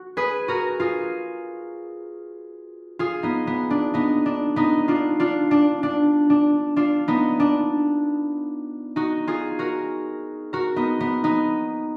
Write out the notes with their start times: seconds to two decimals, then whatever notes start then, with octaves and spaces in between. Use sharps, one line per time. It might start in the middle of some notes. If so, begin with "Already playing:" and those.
Already playing: F#4
0.17 G#4 B4
0.48 F#4 A#4
0.80 F4 G#4
2.99 F4 G#4
3.23 B3 D#4
3.47 B3
3.71 D4
3.94 B3 D#4
4.26 D4
4.56 B3 D#4
4.88 D4 F4
5.20 D4 F4
5.51 D4
5.83 D4
6.30 D4
6.76 D4 F4
7.08 B3 D#4
7.40 D4
8.96 D#4 F#4
9.27 F4 G#4
9.59 F#4 A#4
10.53 F#4 A#4
10.76 B3 D#4
11.00 B3
11.24 B3 D#4